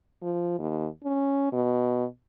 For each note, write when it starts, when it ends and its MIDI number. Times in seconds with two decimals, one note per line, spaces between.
0.22 0.54 53
0.59 0.87 39
1.05 1.52 61
1.52 2.05 47